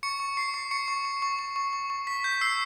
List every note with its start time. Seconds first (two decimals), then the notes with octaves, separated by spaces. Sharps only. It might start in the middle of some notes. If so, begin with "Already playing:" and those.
0.03 C#6 C#7
0.20 C#6
0.37 C#6 C7
0.54 C#6 C7
0.71 C#6 C#7
0.88 C#6
1.05 C#6
1.22 C#6
1.39 C#6
1.56 C#6
1.73 C#6
1.90 C#6
2.07 C#6 B6
2.24 G6 B6
2.41 E6 C7